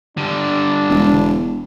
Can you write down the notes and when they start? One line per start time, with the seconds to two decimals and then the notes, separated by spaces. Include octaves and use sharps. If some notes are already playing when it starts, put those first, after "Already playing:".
0.17 D3 G3 D4
0.90 E1